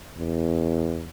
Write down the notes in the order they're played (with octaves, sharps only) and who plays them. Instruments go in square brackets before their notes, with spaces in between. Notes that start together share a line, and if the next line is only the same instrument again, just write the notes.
[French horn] E2